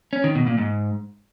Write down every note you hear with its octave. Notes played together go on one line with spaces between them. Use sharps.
C#4
D#3
B2
A#2
G#2